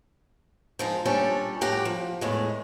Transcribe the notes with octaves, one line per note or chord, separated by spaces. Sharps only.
F3 G#3 D#4
A#2 G3 C#4 D4 A4
F2 A2 G4 F#5 A#5
F3
E2 A2 G#3